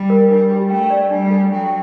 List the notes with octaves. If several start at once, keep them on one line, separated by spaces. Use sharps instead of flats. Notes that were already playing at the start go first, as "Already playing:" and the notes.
Already playing: G3
A#4
G3 D4
G4
A3 G5
D5
G3 D4
A4
F#3 G5